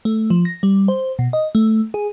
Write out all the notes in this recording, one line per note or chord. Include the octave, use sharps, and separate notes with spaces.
A3
F3
A#6
G3
C5
B2
D#5
A3
G#4